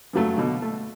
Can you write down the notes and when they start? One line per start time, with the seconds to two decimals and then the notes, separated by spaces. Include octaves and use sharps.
0.13 G2 C#3 F#3 A3
0.37 B2 D3
0.62 A3